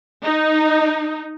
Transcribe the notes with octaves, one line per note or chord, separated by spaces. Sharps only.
D#4